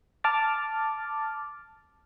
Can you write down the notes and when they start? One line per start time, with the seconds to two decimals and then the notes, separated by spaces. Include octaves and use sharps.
0.24 A5 D6 F6 A6